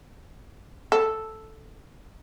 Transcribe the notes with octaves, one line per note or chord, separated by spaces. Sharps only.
A4